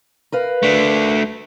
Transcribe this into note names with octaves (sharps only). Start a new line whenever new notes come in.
A#4 B4 F5
A3 D4